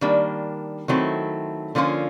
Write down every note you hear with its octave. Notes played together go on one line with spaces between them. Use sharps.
D#3 G3 A#3 D4
D#3 F#3 A3 C4 E4
D3 F3 A#3 C#4 F4